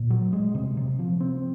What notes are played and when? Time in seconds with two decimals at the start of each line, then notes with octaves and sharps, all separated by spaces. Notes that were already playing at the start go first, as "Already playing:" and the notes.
Already playing: A#2
0.10 F#3
0.33 G#3
0.55 C3
0.77 C3
0.99 F3
1.20 C4